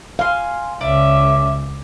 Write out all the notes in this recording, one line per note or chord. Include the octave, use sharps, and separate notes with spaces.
F5 G#5 C6
C#2 C#4 D5 E5